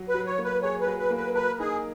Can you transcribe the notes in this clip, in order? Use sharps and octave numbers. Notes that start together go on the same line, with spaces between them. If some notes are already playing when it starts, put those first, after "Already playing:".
Already playing: F#3
B4
F#3
C#5
A#3
B4
G#4 C#5
B4
F#3
B4
A#3
B4
A#4 B4
D#4 G#4